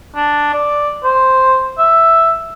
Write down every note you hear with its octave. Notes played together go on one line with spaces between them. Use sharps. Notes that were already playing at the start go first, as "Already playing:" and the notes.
D4
D5
C5
E5